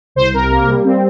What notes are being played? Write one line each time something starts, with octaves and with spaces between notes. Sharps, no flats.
C2 C5
C3 A#4
A#3
G3
C4